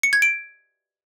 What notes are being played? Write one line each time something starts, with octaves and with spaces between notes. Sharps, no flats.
C#7
G#6
D7